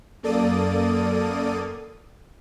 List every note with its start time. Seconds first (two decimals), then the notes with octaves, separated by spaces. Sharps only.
0.23 F#2 A#3 A4 D5 D#6 D#7